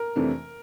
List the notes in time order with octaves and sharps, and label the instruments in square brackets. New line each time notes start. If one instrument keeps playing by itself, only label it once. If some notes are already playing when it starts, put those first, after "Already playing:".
Already playing: [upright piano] A#4
[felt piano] F2 C3 E3 A3 D4